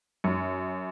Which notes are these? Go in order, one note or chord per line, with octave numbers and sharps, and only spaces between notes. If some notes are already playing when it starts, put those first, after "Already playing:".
F#2